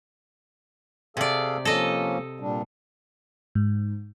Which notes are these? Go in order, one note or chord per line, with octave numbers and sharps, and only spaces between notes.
C3 G#4 A4 D5 F5
F3 A#3 C#4 A4 D#5
A#2 G3 D4
G#2